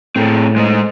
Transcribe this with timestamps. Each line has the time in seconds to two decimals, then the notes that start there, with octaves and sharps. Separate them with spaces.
0.16 A2 C4 G#4 A4
0.56 G#3 C5 D#5